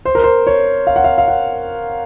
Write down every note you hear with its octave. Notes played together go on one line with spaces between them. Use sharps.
C5
A#4
C5
C#5
F5
F#5
F5
F5
F#5